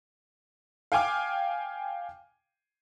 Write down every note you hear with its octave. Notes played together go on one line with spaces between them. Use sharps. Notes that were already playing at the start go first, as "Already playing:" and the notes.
F5 G5 G#5 D6 F6